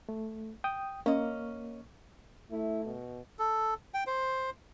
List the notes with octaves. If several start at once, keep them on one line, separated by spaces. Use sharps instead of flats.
A3
G5 D#6
A#3 C#4 D#5
A3 E4
B2
A4
G5
C5